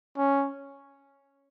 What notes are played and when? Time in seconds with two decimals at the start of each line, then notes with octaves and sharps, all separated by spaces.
0.17 C#4